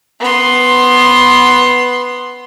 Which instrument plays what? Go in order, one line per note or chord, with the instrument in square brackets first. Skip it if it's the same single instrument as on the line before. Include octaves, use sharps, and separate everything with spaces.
[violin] B3 C6